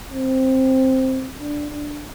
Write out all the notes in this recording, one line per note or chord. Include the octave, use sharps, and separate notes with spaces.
C4
D4
D4